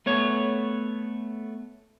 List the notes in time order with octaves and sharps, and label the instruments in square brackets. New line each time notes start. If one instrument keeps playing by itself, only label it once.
[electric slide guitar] A3 B3 C#5